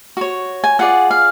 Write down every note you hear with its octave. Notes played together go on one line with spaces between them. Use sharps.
F#4 C#5
G#5
F4 G#4 D5 F#5
F5